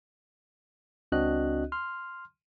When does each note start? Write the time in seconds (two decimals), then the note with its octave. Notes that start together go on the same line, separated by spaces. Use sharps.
1.12 C#2 C4 D4 F#4 D#5 F#6
1.72 C6 F6